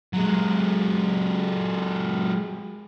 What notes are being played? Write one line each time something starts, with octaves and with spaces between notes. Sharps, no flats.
F#3 G#3